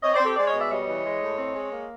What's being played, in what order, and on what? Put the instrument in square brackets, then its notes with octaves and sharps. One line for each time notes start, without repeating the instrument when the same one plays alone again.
[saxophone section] C4 C#5 D#5
C5 D5
C4
G4 A4
G#3 C5 D5
C#5 D#5
B2
D5 E5
G3 C#5 D#5
E3
G#3
A2
C4
G#3
A#3